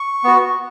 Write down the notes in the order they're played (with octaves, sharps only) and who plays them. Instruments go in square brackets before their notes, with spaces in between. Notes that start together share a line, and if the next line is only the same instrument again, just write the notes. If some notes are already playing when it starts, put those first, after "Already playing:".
Already playing: [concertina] C#6
B3 F#4